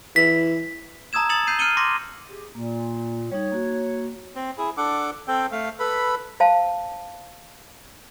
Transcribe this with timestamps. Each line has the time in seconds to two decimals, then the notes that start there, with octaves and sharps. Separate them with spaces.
0.16 E3 B6
1.13 A5 A#5 D#6 E6 G#6 E7
1.29 D#6 A6 C#7 F7 F#7
1.47 G6 C7 D#7
1.59 F6 G6 C#7 D#7 G7
1.77 C6 D6 A#6
2.29 G4 G#4
2.55 A#2 A#3
3.32 G3 D#4 C#5
3.52 A#3 F#4
4.36 C4
4.58 E4 G#4
4.77 D4 A4 F#5 D6
5.28 C4 A4 G5
5.52 A3 F5
5.80 A4 B4 B5
6.40 C5 F5 A5